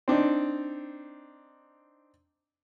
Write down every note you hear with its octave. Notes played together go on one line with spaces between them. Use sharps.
C4 D4 D#4